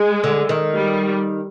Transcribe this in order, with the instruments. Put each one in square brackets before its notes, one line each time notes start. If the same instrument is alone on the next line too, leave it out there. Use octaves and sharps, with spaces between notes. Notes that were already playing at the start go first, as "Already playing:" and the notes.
Already playing: [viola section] G#3
[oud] D3
D#3
[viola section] G3